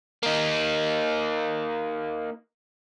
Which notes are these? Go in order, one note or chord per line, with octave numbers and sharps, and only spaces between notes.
A#3 D#4